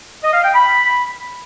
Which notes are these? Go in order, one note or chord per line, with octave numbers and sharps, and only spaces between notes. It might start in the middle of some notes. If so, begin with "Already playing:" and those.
D#5
F5
G5
B5